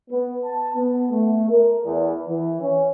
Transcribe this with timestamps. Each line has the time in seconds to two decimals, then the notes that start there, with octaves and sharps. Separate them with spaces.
0.10 B3
0.45 A5
0.75 B3
1.11 A3
1.50 A#4
1.85 E2
2.28 E3
2.60 C#4